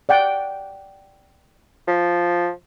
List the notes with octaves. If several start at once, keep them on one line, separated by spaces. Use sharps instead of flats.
D5 F#5 G5
F3